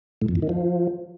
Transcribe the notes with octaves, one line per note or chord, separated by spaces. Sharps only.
A2
F2
E2
D#3
F3